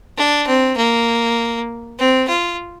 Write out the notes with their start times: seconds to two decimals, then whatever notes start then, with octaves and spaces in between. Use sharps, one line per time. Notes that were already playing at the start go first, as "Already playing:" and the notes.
0.17 D4
0.47 C4
0.77 A#3
1.99 C4
2.28 F4